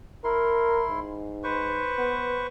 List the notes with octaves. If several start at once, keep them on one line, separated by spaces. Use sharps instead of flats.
E4 A#4 C6
G#2
B4 C5 C#6
B3